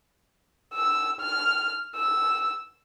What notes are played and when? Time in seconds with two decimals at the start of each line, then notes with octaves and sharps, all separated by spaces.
0.74 E6
1.21 F6
1.96 E6